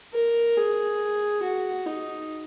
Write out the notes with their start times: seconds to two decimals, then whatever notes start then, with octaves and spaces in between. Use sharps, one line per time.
0.13 A#4
0.57 G#4
1.43 F#4
1.85 D#4